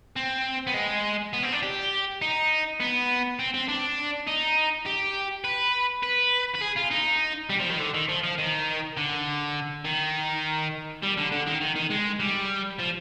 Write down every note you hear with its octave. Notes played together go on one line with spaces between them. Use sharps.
C4
B3
G#3
B3
C4
D4
G4
D#4
B3
C4
C4
D4
D#4
G4
B4
B4
B4
G#4
F4
D#4
G3
F3
D#3
D3
D#3
F3
F3
D#3
D3
D#3
G3
D3
D3
D#3
D#3
D#3
G#3
G3
F3